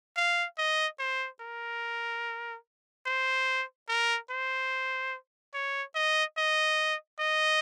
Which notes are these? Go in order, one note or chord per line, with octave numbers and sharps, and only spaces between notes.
F5
D#5
C5
A#4
C5
A#4
C5
C#5
D#5
D#5
D#5